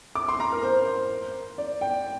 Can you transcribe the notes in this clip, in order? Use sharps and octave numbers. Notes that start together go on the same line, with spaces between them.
D6
C6
A#5
A#4
C5
D5
G5